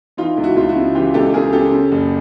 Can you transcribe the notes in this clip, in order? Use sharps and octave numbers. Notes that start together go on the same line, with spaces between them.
E3 D#4 F4
C#2
E4 F#4
C#2 F4
E4 F#4
C#3
E3 F4 G4
C#2 G4 A4
C#2 G#4 A#4
C#3 G4 A4
C#3
F#1